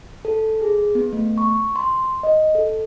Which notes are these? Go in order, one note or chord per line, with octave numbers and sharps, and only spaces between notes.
A4
G#4
B3
A3
C#6
C6
D#5
A4